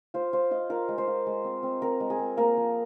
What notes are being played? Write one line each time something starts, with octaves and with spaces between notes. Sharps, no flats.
F4 C5
F4 C5
F4 D#5
F4 A#4
G#3
C5
F4
G#3
C4
C4
C4 A#4
G#3
G#4
C4
A#3 A#4
F3